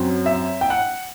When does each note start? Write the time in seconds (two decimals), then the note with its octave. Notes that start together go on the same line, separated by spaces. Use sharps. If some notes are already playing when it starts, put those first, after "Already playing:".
Already playing: F#2 F#3 C4
0.26 E5
0.61 G5
0.70 F#5